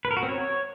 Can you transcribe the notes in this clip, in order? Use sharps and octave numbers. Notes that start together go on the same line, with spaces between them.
B4
A#4
F#4
C4
C#5